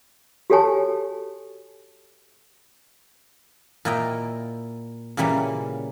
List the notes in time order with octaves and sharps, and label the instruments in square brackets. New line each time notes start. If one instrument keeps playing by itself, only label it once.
[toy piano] F#4 G4 A4 C#5 G#5 A5
[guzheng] A#2 A#3 E4 D#5 G5
A#2 C#3 E3 G3 A#3